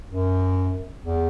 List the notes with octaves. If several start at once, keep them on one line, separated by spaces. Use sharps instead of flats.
F#2
E2